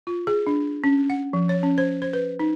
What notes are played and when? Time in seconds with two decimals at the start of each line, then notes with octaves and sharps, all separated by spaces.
0.07 F4
0.27 G#4
0.47 D4
0.84 C#4
1.10 F#5
1.33 F3
1.49 C#5
1.63 C#4
1.78 C5
2.02 C5
2.13 B4
2.39 D#4